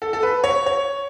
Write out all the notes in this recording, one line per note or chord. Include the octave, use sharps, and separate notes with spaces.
A4
A4
B4
C#5
C#5